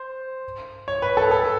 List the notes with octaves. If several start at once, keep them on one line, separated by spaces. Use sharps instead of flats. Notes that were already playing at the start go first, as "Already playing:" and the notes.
Already playing: C5
C#5
B4
A4
A4